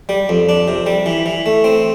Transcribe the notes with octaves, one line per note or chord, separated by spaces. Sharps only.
G3
F2
D4
C3
G3
E3
E3
A3
C4